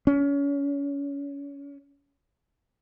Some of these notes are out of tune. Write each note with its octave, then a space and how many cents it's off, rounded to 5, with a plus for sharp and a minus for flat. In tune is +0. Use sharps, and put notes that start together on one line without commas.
C#4 +30